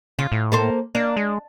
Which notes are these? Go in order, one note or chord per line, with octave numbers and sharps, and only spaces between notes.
C#3 F4
A2
A#3 A4 C5
A#3 D4
G#3